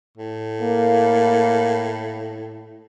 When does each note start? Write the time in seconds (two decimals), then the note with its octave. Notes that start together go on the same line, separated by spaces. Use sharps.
0.17 A2
0.62 A#3